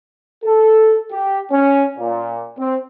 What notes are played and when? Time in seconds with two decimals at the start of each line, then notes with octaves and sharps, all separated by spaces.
0.44 A4
1.11 G4
1.50 C#4
1.97 A#2
2.58 C4